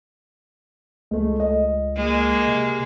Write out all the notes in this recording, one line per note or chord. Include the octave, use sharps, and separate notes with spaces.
C#2 G#3 A3
D#5
G#3 A#3
C3